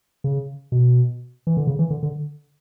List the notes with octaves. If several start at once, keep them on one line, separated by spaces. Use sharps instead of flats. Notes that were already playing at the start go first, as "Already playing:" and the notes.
C#3
B2
E3
D3
C#3
E3
D3
D3